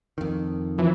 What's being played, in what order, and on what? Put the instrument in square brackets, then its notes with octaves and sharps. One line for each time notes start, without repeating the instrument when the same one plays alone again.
[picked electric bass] F2 D#3
[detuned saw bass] E3 [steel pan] F3